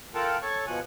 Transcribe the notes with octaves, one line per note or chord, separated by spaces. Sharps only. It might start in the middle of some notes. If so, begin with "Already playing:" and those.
F4 A4 A#4 F#5 G5 A5
A4 C#5 C#6
B2 F3 F#5 G#5